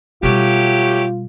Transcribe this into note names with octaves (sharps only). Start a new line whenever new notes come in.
B2 F#3 G3 A3 F4 G4